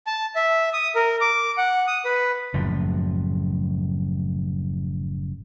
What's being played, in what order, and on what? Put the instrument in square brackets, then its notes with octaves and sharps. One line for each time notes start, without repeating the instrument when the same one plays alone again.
[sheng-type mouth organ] A5
E5
D#6
A#4
D6
F#5
D#6
B4
[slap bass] F#1 F#2 A2 F3